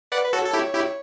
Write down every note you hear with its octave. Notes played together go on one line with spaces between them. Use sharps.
B4 D5 F#5
B4
F#4 A4 C#5
A4
E4 G4
E4 G4